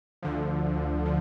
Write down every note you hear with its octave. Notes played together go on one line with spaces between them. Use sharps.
D2 D3 F3
F3